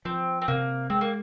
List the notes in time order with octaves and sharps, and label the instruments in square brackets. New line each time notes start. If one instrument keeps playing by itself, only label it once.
[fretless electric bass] F3 [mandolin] C4
[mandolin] C4
[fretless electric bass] C3 [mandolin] A#3
[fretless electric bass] G#3 [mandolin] C4
[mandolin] A#3